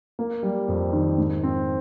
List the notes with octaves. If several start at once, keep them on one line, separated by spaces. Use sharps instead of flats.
A#3
G3
F2
D#3
G#2
C4